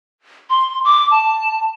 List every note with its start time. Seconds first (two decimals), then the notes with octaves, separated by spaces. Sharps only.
0.50 C6
0.85 D6
1.11 A5